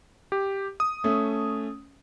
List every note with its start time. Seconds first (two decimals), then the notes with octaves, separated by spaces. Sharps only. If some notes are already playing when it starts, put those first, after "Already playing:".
0.32 G4
0.80 D#6
1.04 A3 C#4